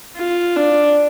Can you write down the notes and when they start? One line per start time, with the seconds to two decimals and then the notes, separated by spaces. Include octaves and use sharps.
0.16 F4
0.56 D4